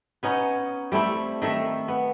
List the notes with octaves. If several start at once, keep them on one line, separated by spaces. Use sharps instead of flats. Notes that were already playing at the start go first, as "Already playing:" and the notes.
B3 C#4 D#4
G3 A3 C4 E4
D#3 A3 E5
B3